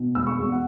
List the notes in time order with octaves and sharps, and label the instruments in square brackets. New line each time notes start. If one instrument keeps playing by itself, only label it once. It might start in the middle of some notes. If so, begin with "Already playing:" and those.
Already playing: [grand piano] B2
E1 E6
C#6
E2
F#5